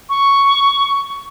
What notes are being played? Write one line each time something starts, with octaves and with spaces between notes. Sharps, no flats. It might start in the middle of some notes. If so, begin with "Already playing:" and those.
C#6